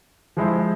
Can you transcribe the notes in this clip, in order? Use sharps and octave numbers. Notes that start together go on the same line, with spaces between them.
F3 G#3 E4 G#4 C5